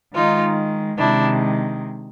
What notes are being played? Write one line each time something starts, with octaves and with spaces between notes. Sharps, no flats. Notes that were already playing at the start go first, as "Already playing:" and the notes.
D#3 G#3 D#4 F4
C3 D#3 G#3 D4 E4